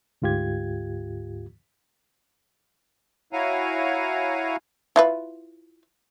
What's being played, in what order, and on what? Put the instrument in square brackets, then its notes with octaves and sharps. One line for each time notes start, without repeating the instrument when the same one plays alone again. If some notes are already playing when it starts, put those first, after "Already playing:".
[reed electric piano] D2 G#2 F4 G4 G#6
[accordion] E4 F#4 C#5 F5 G#5 A#5
[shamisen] E4 F4 B4